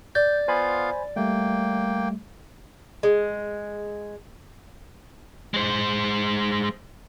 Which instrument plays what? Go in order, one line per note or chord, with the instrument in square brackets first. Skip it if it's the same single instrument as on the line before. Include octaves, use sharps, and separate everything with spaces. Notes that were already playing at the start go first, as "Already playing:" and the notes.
[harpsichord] D5 [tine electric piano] G6
[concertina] B3 F4 F5 [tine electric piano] C5 G#5 B5
[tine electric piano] G3 A3 [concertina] A#3 G5
[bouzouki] G#3
[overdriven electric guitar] G#3 C5